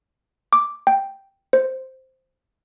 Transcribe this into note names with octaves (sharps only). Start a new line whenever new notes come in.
D6
G5
C5